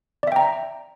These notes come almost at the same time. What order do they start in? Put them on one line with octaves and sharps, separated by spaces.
D5 E5 G5 A#5